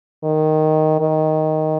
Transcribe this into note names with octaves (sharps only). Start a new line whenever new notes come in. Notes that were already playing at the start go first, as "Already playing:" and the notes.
D#3
D#3